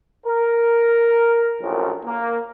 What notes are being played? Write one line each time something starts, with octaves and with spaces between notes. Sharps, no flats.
A#4
A#1 F#2 A2
A#3